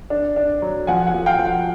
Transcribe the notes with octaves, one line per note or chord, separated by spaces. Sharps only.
D4
D4
F#3
F3 F#5 G#5
F#5 G#5
F3
F5 G5
F3
F#5